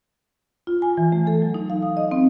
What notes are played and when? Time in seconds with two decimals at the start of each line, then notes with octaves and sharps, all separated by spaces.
0.67 F4
0.82 G#5
0.97 E3
1.12 A3
1.27 A4
1.42 F#3
1.54 D#4
1.70 F5
1.82 D#6
1.97 D#5
2.11 C4